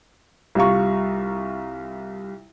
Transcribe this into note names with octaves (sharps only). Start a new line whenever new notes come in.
C2 G3 F4 A#5 C#6